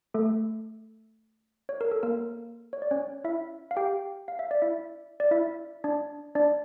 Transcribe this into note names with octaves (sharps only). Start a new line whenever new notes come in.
A3 A4
C#5
A#4
A4
A#3 A#4
C#5
D5
C#4 C#5
E4 E5
F5
G4 G5
F5
E5
D5
E4 E5
D5
E4 E5
D4 D5
D4 D5